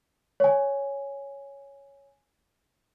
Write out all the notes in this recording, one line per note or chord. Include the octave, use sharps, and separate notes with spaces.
C#5 G#5